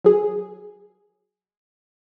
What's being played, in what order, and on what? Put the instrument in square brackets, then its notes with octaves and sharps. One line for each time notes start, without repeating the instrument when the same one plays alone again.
[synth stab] F#3 G#4